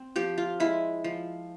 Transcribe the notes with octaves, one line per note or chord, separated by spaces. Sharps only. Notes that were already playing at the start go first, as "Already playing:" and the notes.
Already playing: C4
F3 G4
F4
G#3 E4
F3